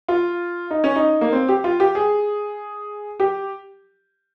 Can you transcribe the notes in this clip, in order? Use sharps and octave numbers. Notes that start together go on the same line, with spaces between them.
F4
D#4
C#4
D#4
A#3
C4
G4
F4
G4
G#4
G4